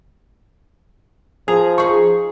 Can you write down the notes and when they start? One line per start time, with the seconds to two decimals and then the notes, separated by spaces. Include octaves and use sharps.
1.48 F3 G#4 A#5
1.78 D#4 G#4 C#6